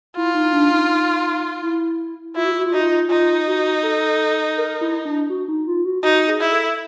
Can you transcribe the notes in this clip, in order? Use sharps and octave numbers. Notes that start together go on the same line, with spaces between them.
E4 F4
D#4
D4
D#4
D#4
E4
E4 F4
F#4
F4
F#4
F4
D#4 F#4
F4
D#4 F4
F#4
A4
A#4
E4
D4
F#4
D#4
F4
F#4
D#4 F#4
G#4
E4
A4